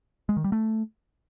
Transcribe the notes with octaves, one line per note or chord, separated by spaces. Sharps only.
G#3
D#3
G3
A3